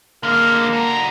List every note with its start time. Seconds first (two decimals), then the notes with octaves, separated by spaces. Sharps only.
0.23 D3 G#3 A#3 F6
0.73 F#4 A4 A#5